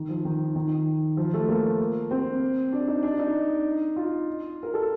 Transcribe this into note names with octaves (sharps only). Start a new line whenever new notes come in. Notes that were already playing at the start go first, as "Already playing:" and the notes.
Already playing: D#3
F3
D#3
D#3
F3
A3
A#3
C4
D4
D#4
D4
D#4
F4
A#4
A4